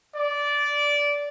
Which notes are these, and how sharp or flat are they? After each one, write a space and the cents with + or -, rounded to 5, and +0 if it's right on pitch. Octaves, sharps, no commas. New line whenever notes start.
D5 -15